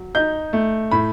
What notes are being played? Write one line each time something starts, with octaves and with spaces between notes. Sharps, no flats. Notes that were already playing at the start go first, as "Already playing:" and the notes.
Already playing: F#3
D#4 G6
A3
A2 B5